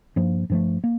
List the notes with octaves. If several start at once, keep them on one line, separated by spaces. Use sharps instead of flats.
G2 F3 A#3
G2 F3 A3
A#3